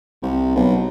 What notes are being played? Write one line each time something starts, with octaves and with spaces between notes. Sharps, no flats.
C2
B1